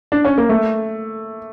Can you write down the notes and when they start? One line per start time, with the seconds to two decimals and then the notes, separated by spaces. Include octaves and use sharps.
0.12 D4
0.25 C#4
0.38 A#3
0.49 A3